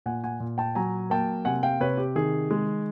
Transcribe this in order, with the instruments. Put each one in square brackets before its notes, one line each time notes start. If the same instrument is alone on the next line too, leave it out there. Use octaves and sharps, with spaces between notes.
[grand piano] A#2 F#5 G#5
F#5 G#5
A#2
G5 A5
F#3 G#5 A#5
A#3 G5 A5
C3 F#5 G#5
F5 G5
C3 B4 C#5
G4
D#3 G#4
G#3